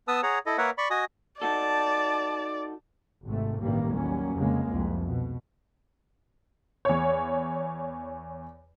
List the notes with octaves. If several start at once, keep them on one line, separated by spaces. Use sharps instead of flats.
B3 B4 A5 D#6 E6
G#4 C#5 F#5 A#5
E4 A4 D#5
A#3 A#4 B4 C#5 E5 F#5
D5 B5 C#6
F#4 D#5 G#5 D#6
D#4 F#4 A4 D5 A5
G#1 C3 A3
A1 G2 C3 D#3 G3 A#3
D#2 F#3 G3 A#3 C#4
F1 F2 C#3 G#3 A#3
F1 C2 F2
B2
E2 C#5